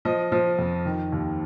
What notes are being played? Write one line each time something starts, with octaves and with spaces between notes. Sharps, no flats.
F3 D#5
F3
F2
D#3
D#2